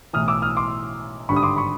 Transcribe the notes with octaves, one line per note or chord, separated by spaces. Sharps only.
B1 A2 E3 D#6 F6
D6 E6
D#6 F6
C6 D6
G#1 G2 D3 B5 C#6
D#6
C6 D6
B5 C#6